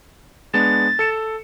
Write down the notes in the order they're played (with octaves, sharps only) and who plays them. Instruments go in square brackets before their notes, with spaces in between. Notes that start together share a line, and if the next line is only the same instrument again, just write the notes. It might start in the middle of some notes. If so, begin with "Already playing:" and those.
[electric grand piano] G#3 B3 D4 [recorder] A6
[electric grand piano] A4 C#7 E7